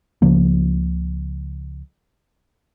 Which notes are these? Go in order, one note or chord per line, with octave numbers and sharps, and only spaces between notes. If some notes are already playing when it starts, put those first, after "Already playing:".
C#2 C#3 F3 A#3